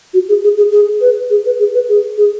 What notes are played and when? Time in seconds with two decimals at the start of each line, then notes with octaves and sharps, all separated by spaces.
0.14 F#4
0.29 G#4
0.44 G#4
0.58 G#4
0.72 G#4
1.01 B4
1.30 G#4
1.46 B4
1.59 G#4
1.74 B4
1.89 G#4
2.18 G#4